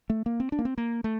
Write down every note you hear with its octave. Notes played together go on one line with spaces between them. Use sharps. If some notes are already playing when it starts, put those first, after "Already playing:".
A3
A#3
C4
D4
A#3
C4
A#3
A3